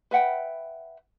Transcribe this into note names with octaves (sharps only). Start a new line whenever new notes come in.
B4 E5 F#5 G5